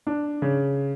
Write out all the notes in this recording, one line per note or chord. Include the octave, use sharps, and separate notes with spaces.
D4
C#3